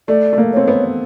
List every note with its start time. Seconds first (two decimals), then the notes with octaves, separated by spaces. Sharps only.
0.08 A3 D5
0.33 A3
0.38 A#3
0.53 C4 C#5
0.68 B3